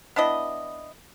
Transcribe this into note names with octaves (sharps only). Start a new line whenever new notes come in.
B3 D4 E4 D#5